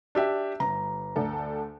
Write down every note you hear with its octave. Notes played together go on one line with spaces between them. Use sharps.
D4 G4 E5
G1 A#5
D2 D4 A4